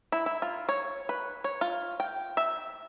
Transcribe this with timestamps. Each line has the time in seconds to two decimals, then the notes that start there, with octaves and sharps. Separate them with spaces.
0.12 E4
0.26 E4
0.42 F4
0.69 C#5
1.09 B4
1.44 C#5
1.61 F4
2.00 G5
2.37 E5